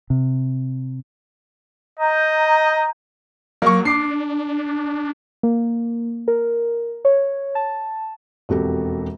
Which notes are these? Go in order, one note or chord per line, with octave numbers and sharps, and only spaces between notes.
C3
D#5 A#5 G6
F#3 A#3 C#6
D4 D6 C7
A#3
A#4
C#5
A5
E1 F2 F#4 G4 A4